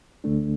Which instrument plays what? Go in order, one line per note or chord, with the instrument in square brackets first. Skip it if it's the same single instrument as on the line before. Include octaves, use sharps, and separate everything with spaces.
[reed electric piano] D2 D3 A3 D4